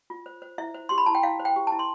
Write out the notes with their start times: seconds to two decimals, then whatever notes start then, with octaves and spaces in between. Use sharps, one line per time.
0.10 F4
0.26 C5
0.42 C5
0.58 E4 E5
0.74 C5
0.89 G4 C6
0.98 B5
1.06 E4 A5
1.15 G5
1.23 E4 F5
1.40 C5
1.45 G5
1.56 G4
1.67 E4 A5
1.79 C6